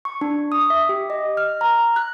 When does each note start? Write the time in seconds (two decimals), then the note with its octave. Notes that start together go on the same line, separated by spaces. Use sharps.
0.05 C#6
0.21 D4
0.52 D#6
0.70 E5
0.89 G4
1.10 D#5
1.37 F6
1.61 A#5
1.96 F#6